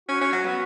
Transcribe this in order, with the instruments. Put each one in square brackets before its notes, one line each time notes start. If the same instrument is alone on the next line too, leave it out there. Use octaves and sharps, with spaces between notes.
[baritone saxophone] C#4 [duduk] F#4
[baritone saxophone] C#4
F#3
B3